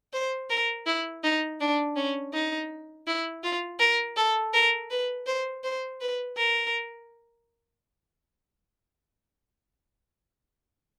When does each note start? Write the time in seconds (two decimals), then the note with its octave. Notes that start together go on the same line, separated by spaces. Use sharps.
0.13 C5
0.50 A#4
0.86 E4
1.23 D#4
1.60 D4
1.96 C#4
2.33 D#4
3.07 E4
3.43 F4
3.79 A#4
4.16 A4
4.54 A#4
4.90 B4
5.27 C5
5.64 C5
6.01 B4
6.37 A#4